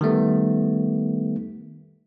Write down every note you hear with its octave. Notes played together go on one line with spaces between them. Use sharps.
D#3 G3 A3 B3